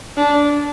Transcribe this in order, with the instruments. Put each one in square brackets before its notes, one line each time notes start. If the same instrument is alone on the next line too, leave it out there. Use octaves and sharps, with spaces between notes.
[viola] D4